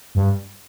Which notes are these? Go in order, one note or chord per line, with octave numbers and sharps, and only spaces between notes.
G2